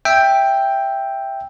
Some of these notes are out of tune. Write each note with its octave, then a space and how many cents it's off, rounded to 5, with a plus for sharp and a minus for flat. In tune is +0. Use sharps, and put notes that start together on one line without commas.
E5 +0 G5 +5